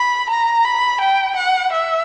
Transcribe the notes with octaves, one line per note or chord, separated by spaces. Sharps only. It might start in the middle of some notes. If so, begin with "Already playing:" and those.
Already playing: B5
A#5
B5
G5
F#5
E5